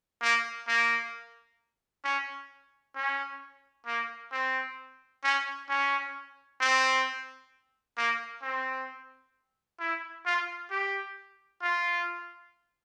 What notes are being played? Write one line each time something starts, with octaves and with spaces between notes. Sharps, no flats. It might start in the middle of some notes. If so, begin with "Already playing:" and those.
A#3
A#3
C#4
C#4
A#3
C4
C#4
C#4
C4
A#3
C4
E4
F4
G4
F4